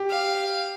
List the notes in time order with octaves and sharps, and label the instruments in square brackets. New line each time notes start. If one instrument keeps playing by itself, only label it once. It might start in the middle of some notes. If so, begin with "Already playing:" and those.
Already playing: [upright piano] G4
[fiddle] F5